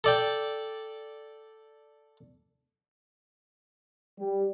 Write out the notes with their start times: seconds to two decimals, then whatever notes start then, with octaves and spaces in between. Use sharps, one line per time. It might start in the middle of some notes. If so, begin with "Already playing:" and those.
0.04 A4 D5 G5
4.19 G3